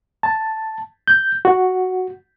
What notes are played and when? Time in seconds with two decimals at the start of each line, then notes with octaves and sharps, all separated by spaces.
0.23 A5
1.08 G6
1.45 F#4